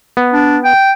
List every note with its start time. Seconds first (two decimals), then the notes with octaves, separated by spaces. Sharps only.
0.17 B3
0.33 D4
0.64 G5